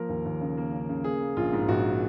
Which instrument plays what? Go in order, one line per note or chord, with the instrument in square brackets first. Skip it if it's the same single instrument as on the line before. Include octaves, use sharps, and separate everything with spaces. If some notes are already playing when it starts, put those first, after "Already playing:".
Already playing: [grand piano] F3 A#3 A#4
D#2
D#2
C#3
A#3
C#3
C#3
A#3 G#4
A#3
A#1 F4
G#2
A#1 F#4